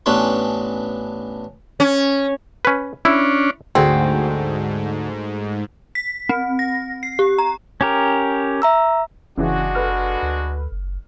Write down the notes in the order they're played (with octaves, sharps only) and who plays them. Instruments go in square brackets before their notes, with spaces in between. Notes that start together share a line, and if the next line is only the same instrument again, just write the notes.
[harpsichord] A1 B3 C#4 D4 B4 C6
[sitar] C#4
[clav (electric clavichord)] C#4 B4
[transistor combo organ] C#4 D4 [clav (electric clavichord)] E4
[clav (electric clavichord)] D2 D3 G#5 [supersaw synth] G#2 [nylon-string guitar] A3 F#4 G#4 [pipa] C4
[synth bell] B6
C4
A#6
C7
G4
A#5
[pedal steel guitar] C#4 G4 A#4
[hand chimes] E5 A#5 E6
[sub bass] F#1 [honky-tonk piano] C#3 E3 G#4 [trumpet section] G#3 D4 F#4
[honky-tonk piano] A4 B4 F6
[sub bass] D2
F#1